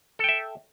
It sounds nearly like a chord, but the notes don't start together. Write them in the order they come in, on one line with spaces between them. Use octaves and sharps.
A4 G5 E5